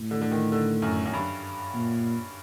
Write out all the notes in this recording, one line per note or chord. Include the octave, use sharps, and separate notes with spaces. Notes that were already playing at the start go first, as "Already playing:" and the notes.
Already playing: A2
D3
D3
D#3
D3
F#2
F#2
G2
A#2